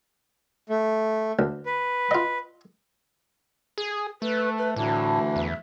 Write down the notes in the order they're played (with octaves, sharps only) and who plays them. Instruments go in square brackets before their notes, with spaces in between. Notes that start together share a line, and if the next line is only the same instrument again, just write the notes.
[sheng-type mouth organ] A3
[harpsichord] D2
[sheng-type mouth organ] B4
[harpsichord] F4 D#5
[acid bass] G#4
[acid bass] A3 [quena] B4
[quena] B4
[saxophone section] D2 E3 [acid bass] A2 [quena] A5
[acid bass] E2 [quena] E5